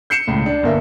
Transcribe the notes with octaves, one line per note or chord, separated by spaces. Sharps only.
G6 C7 C#7 E7
C#2 A2
D4
G1 A#3 E5